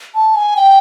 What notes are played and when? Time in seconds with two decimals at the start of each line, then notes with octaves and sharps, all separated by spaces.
0.15 A5
0.36 G#5
0.57 G5